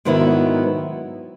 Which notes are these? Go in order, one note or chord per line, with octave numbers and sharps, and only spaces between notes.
G#2 D#3 F#3 B3 E4